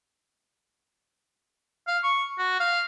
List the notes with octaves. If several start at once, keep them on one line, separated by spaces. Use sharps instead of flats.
F5
C#6
F#4
F5